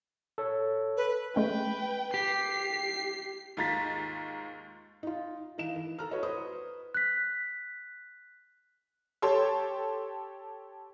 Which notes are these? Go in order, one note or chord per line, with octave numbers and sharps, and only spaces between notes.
A4 C#5
B4
G#3 A3 C#4 B4 G5
G4 C7
D#2 G#2 F4 A#5 A6 B6
D#4 F4
E3 D#4 F5 E7
E3
A4 A#5 F6
F#4 B4 C#5 D#5
B4 C5 D#6
F#6 B6
G4 A4 C#5 C6